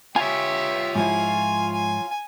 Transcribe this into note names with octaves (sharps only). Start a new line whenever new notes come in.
F4 G4 C#5 E5 G#5
G#2 F3 E4 G#5
G#5